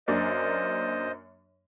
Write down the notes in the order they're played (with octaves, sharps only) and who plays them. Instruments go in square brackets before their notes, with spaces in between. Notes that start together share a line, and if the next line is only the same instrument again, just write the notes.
[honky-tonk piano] F#2 A#3 D4 [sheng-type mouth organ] C5 D#5